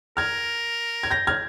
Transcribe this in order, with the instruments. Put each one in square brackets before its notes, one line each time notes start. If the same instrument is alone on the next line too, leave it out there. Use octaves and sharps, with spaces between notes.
[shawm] A#4 [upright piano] F6 G#6
[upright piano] G#6
G6 A#6
F6 G#6